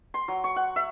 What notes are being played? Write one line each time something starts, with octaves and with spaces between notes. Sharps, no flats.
C6
F#3
C#6
F#5
E5